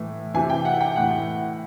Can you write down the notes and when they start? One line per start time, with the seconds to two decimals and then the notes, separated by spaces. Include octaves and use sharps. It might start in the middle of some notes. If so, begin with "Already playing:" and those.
Already playing: A2 E3
0.34 C3 E3 G#5
0.50 G5
0.65 F#5
0.81 G5
0.96 A2 E3 F#5